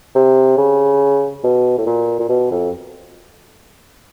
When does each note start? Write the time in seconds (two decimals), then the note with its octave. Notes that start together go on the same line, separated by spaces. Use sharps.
0.15 C3
0.58 C#3
1.44 B2
1.78 A2
1.86 A#2
2.19 A#2
2.29 B2
2.51 F2